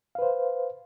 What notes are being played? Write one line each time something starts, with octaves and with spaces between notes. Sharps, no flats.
B4 C5 F5